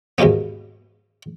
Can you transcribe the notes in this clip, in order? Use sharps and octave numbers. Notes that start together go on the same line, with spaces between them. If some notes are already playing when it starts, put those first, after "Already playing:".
D#2 G#2 B2 A#3 B3